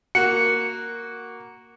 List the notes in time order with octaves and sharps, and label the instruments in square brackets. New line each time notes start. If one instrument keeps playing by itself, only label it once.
[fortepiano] A#3 F#4 [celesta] C#7